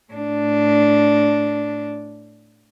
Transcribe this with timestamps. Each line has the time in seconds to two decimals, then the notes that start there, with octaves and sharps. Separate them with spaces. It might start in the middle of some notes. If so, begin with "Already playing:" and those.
0.13 A2 D4